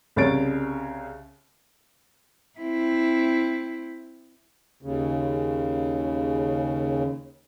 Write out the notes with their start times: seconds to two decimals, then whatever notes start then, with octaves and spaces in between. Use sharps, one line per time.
0.16 C2 C#3 C#5 A6 D7
2.59 C4 E4
4.83 D#2 C#3